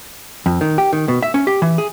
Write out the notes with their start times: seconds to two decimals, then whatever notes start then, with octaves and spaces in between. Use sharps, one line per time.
0.46 F2
0.61 D#3
0.78 G4
0.93 D#3
1.08 B2
1.23 E5
1.34 C#4
1.47 G4
1.62 E3
1.78 G#4